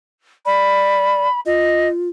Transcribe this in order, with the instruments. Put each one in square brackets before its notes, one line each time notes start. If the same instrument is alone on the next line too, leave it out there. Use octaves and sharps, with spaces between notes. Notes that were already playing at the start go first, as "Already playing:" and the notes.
[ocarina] D5 [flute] B5
[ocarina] F4 [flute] D#5